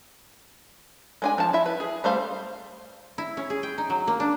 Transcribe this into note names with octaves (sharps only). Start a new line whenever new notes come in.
G#3 D4 G#5
F3 A5
E4 E5
B4
G#4
G3 A3 C5 F5
E4
C#4
G#4
G5
D#4
F#3
A#3
D4